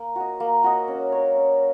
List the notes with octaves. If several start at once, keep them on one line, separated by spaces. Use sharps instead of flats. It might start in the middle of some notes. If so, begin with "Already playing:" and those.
Already playing: A#3
F#4 D#5
A#3
F#4 D#5
C#4
A#4 C#5
C#4